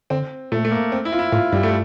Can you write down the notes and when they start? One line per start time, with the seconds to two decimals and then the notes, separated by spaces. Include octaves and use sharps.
0.10 D3 C4
0.52 A#2 A3
0.65 A3
0.71 A#3
0.92 C4
1.05 E4
1.12 F4
1.19 E4
1.32 A2 F4
1.52 G2 G3
1.63 A3